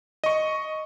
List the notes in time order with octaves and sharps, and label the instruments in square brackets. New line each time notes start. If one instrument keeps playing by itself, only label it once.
[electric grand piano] D#5 C#6